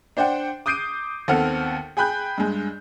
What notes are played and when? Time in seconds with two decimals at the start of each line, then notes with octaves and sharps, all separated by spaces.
0.17 D4 C5 D5 F#5 G5
0.66 D6 D#6 G6 C7 D7 D#7
1.28 D#2 B3 C4 A4 F#5 F6
1.97 G#4 G5 B5 F#6 G6
2.38 G2 G#3